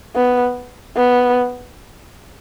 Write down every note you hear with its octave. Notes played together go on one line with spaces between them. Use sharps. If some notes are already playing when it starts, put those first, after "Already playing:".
B3
B3